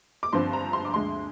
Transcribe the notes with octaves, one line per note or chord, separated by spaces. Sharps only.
D6
G2 D3 F3 C4 C6
A#5
C6
D6
D2 D3 G#3 C6